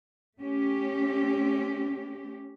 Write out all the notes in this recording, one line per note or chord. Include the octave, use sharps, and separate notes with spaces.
A3 C#4 G4